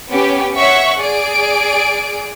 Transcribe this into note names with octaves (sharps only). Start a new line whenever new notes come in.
B3 C#4 G4
C#5 E5 F#5 C#6
G#4 D5 D7